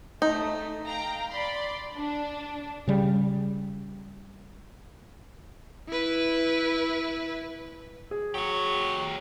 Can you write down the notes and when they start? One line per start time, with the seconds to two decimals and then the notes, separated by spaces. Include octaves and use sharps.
0.22 A3 D#4
0.86 F5 G5 A#5
1.30 D5 B5 C6
1.96 D4
2.88 C#3 G3
5.88 E4 B4
8.11 G#4
8.34 F#3 G4 C#5